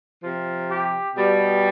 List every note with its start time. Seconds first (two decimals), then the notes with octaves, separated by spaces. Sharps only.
0.24 C3 F3
0.70 G4
1.16 B2 G3